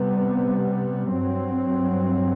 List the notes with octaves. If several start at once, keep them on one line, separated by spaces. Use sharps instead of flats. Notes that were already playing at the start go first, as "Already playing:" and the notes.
Already playing: C3 G3 B3
G2 F#3 C4